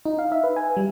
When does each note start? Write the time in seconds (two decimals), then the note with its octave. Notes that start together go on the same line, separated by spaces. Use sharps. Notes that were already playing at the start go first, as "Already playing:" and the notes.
0.05 D#4
0.19 F5
0.32 E5
0.44 B4
0.56 G#5
0.77 G3